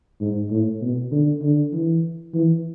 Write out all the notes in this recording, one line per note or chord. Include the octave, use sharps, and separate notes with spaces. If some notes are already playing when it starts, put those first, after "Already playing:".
G#2
A2
B2
D3
D3
E3
E3